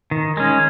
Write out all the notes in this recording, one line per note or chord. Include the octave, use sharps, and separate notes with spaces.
D#3
G#3 C#4